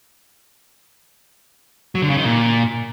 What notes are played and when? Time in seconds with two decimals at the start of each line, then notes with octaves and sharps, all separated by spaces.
1.95 F#3
2.02 D3
2.10 C#3
2.17 D#3
2.25 A#2